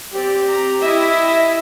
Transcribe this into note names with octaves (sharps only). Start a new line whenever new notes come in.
C4 G4 D5
C4 A#5
E4 D#5 E5